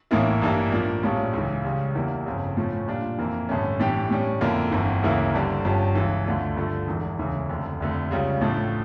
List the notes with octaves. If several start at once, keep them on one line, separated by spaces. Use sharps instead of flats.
A1 A2 E3 A#3 E4
A1 G2 E3 G3 A#3
A2 F3 A#3 D4
A#1 A2 G3 C#4 F4
C#2 C#3 E3
C#2 C#3 G3 C#4
E2 E3 G3 A#3 E4
G1 F2 C#3
A2 F3 A3 C#4
A#2 G3 D4 F4
F2 E3 A#3
A1 G2 D3 A3 C#4
A2 E3 G3 D4 G4
A2 G3 C#4
F2 D3 F3 A#3 E4
G1 F2 E3
D2 C#3 E3 A#3 E4
G1 G2 D3 G3
G1 G2 F3 C#4 G4
C#2 C#3 E3
D2 D3 A3 D4 F4
G2 D3 F3 A3
E1 E2 E3
E1 D2 C#3 E3
F1 F2 D3 A3
F1 F2 D3 A3
C#2 C#3 G3 C#4 F4
A1 A2 F3 A3 D4